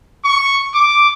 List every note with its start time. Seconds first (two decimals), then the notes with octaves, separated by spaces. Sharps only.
0.24 C#6
0.72 D6